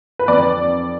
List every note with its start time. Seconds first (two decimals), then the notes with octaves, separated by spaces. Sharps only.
0.19 B4
0.28 F2 D5